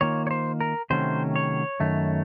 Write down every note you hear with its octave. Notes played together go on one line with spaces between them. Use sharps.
D#3 A#3 F4 C#5
C#5
C5
A#4
C3 D#3 F#3 A3 C#4 C5
C#5
F#2 D#3 A3